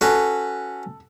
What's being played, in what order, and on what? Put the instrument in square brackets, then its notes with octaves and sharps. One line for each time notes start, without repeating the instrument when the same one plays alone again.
[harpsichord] C#4 F#4 B4 [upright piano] A4